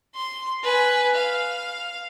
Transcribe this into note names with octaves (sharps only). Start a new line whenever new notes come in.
C6
B4 G#5
F5